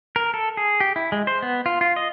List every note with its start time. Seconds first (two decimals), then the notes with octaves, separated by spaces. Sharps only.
0.16 A#4
0.34 A4
0.57 G#4
0.80 G4
0.96 E4
1.12 G#3
1.27 C5
1.42 B3
1.66 F4
1.81 F4
1.96 D#5